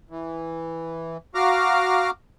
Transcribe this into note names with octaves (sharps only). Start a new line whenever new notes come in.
E3
F#4 F5 A#5 D6 F6